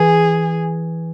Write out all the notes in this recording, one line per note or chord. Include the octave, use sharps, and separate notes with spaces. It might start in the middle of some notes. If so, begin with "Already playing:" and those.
Already playing: E3 G#4